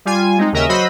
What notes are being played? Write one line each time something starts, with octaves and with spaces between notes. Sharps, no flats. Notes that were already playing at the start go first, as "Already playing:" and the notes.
G3 F4 G#5
G#3 C4 D#4
D#2 C#3 A#4 D#5 E5
F#3 F#4 C5 D#5 B5 E6